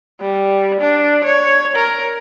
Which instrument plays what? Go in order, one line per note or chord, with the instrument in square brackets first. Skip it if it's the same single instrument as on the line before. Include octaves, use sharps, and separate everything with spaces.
[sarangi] G3
D4
C#5
A#4